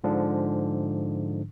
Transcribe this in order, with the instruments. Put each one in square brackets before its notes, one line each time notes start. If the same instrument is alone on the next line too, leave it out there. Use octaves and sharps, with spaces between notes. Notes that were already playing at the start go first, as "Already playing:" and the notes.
[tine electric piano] G#2 D3 F3 D4